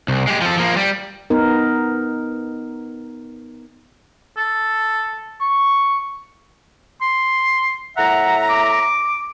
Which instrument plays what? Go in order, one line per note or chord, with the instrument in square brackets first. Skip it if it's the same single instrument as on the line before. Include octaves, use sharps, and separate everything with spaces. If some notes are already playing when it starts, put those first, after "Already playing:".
[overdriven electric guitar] C2
G#3 G4
F3 A4
F3 A#3
G3
[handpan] B3 D#4 A#4
[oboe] A4
C#6
C6
[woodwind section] A2 E5 A#5 [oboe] F#5
[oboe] D6